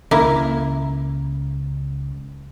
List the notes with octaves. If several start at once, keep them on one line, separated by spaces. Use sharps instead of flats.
C#2 C#3 A#3 E4